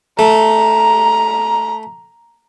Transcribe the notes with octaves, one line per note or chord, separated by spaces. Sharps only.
A3 A#5